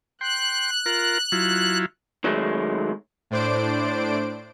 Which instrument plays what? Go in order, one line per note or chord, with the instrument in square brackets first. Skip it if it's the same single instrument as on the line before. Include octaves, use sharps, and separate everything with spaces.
[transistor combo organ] G5 C6 [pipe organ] F#6
[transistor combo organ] F4 A#4
F#3 E4 F4
[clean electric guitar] D#3 F#3 G#3 A3
[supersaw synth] A2 D4 C5 D5 D7